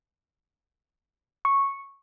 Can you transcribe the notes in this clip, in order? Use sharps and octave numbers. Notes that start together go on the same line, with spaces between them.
C#6